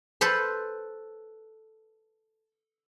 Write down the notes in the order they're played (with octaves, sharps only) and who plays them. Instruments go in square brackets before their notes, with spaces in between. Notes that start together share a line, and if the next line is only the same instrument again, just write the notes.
[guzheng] A4 B4 C5 C6